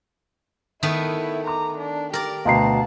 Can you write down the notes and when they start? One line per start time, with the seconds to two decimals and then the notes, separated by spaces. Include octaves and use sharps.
0.83 D#3 A3 B3 E4
1.47 A#5 D6
1.78 D4
2.13 G4 A#4 D5
2.45 D2 B2 F5 G5 A5 A#5 C7